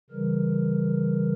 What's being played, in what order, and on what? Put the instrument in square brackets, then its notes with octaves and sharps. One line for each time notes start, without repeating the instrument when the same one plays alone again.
[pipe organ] C#3 E3 G3 A#4